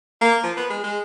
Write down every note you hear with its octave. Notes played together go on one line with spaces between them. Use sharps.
A#3
F3
B3
G#3
G#3